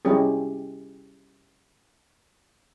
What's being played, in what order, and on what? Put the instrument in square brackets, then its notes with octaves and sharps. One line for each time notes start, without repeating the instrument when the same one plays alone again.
[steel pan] G3 C#4 E4 G4 G#4